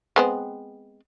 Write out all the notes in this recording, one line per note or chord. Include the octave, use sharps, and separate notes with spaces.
G#3 B3 C4